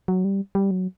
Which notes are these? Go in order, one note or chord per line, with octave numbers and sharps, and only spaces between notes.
F#3
G3
G3
F#3